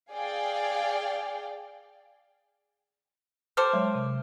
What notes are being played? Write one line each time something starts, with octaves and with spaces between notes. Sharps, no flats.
G#4 D5 F5 G5
G4 A4 C5 D6 F6
F#3 G#3 C#5
C3